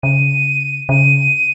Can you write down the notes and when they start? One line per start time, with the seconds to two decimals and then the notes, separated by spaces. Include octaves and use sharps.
0.03 C#3 D#7
0.89 C#3 D#7